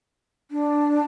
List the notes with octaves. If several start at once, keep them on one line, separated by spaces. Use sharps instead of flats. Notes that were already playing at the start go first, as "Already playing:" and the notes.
D4